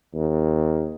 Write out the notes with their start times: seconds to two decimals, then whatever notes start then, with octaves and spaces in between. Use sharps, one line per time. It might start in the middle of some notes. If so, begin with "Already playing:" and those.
0.14 D#2